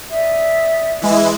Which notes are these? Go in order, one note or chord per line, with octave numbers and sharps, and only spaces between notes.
D5 E5 D#6
E3 G#3 E4